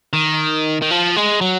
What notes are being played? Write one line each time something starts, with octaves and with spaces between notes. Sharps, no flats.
D#3
D#3
F3
G#3
F#3